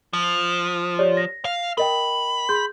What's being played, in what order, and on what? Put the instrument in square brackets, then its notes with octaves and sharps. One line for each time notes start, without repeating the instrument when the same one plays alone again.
[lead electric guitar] F3
[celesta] G4 C#5 D5
A#6
[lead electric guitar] F5
[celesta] A#4 D#5 G5 [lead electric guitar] B5
[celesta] G#4 C6 G6